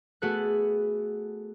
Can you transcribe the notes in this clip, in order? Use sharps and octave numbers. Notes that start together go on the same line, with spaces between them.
A3 B3 F#4 G#4 A4 F#6